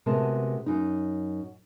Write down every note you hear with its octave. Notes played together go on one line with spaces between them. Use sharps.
D2 C3 G#3 B3 A#4 A5
F#2 D#4